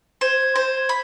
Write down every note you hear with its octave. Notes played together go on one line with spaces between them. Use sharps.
C5 G#6
C5
B5